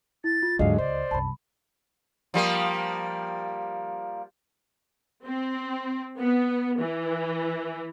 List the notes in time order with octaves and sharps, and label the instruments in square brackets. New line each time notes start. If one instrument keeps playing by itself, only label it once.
[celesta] E4 [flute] A6
[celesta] F4
[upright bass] D#2 G#2 [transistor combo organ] D3 F#3 G#3 [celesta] D#5 [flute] F5
[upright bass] C#2 [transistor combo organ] C5 [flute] D5
[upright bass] C2 F#2 [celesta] A5 B5
[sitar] F3 G3 A#3
[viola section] C4
B3
E3